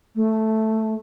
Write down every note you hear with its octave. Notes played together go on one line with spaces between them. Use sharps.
A3